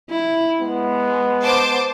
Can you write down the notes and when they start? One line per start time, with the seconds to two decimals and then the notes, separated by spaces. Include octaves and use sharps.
0.10 E4
0.61 G#3 B3
1.42 C5 A5 D6